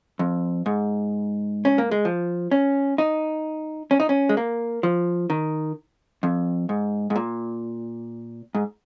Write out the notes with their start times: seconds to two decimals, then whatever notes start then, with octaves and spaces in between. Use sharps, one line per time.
0.19 F2
0.66 G#2
1.65 C#4
1.78 A#3
1.91 G#3
2.05 F3
2.51 C#4
2.98 D#4
3.91 C#4
4.00 D#4
4.09 C#4
4.29 G#3
4.37 A#3
4.83 F3
5.30 D#3
6.23 F2
6.69 G#2
7.10 G#2
7.16 A#2
8.55 G#2